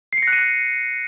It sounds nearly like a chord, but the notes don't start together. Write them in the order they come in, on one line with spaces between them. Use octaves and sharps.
C7 C#7 A#6 F#6 D#7